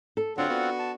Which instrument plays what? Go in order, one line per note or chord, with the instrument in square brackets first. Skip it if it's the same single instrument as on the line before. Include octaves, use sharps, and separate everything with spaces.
[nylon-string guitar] A4
[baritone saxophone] D3 [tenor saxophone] F#3 [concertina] C4 F4 F#5 [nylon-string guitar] D4
[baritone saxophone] B3 [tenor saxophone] F#4
[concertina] A5